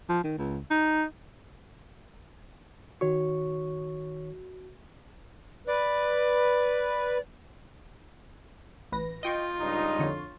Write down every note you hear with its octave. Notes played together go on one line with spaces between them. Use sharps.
F3
D#3
C#2
D#4
D#3 F#4 C#5 C#6
B4 D5
A1 B4 A#6
F4 D#5 G5 C#6
C#2 G2 D#4
F2 D3 C#5